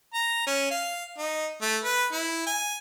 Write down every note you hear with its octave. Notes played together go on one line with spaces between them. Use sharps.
A#5
C#4
F5
D#4
A3
B4
E4
G#5